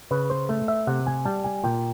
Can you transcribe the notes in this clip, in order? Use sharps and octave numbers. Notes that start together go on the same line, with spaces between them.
C#3 B4
C5
A3
E5
C3 F#5
G#5
G3 A5
G#5
A#2 G5